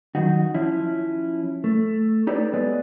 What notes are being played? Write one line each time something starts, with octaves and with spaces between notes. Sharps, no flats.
D#3 F#3 D#4 F#4
F3 C#4 E4
A3
D#4 G4 A4 B4 C#5 D5
G#3 B3 G#4 B4 D5